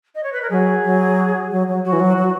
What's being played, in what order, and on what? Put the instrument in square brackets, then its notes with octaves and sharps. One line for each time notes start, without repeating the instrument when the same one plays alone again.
[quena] D#5
C#5
B4
A#4
[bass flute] F#3 [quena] G#4
[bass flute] F#3
F#3
F#3
[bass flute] F#3 [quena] F#4
[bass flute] E3
F#3
F#3